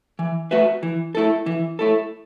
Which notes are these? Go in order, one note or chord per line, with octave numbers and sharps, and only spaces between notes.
E3
A3 F#4 B4 E5
E3
A3 E4 A4
E3
A3 E4 A4